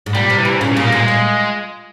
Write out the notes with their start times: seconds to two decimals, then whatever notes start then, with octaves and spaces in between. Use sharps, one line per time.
0.06 G#2
0.15 A#2 G3
0.30 C3
0.38 E3
0.45 C3
0.61 A#2 C#3
0.72 A#2 C#3
0.85 A#3
0.92 A#2 G#3
1.08 A#2